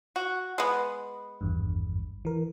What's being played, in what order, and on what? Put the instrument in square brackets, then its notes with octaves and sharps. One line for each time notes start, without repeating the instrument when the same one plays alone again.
[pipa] F#4
G#3 B3
[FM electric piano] G#1 E2 G2
E3 A#4